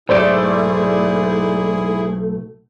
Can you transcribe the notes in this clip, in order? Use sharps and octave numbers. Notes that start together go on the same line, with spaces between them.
B1 G#2 A3 E4 G#4 C5 D5 D7